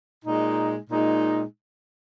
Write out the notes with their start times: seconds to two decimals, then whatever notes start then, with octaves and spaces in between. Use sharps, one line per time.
0.23 A#2 G#3 D#4
0.89 A#2 G#3 D#4